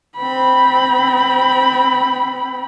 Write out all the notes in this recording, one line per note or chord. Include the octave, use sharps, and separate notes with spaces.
C4 B5